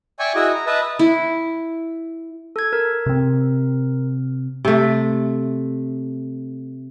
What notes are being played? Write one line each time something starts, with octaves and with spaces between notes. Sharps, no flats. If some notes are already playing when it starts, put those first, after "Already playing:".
D5 E5 G5 G#5 C#6
E4 F#4 G#4 D#5 E5
A#5
B4 D#5 E5 A5
E4
A4 G#6
A#4
C3 C4
C3 A3